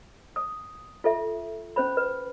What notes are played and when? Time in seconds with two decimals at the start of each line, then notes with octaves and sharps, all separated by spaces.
0.36 D#6
1.04 F4 A4 E5
1.76 C#4 C5 B5
1.97 B4